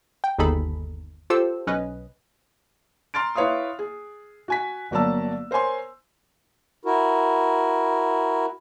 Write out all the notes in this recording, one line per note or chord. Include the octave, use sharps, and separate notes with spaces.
G5
G1 D#2 D#4 G#4 A4 B5
F4 G4 A4 C5 E6
B1 C#4 B4 D#5
A#5 C6 F6 A6 D7
E4 B4 C#5 F5 C6 D#6
G#4
F#4 G#5 B6
G1 F#3 A#3 D5 A5 E6
A#4 C5 C#5 G#5 C6
E4 F#4 A#4